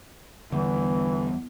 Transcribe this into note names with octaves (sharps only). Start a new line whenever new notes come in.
E2 D3 E3 G3